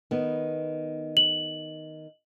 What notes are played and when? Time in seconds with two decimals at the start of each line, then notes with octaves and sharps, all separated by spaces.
0.11 D#3 B3
1.17 F#7